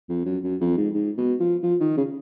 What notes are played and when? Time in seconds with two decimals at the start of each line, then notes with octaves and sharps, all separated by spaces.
0.09 F2
0.26 F#2
0.44 F#2
0.60 F2
0.77 G#2
0.94 G#2
1.18 B2
1.40 F3
1.63 F3
1.81 D#3
1.97 C#3